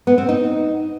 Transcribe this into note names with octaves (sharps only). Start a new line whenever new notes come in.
B3
C4
D#4